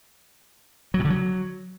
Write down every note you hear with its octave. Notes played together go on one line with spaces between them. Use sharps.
F#3
B2
D3
F#3